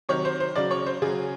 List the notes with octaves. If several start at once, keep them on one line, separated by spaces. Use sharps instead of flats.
C3 D#3 F#3 C#5
C5
C5
C#3 F#3 D5
C#5
C5
C#3 F#3 G#4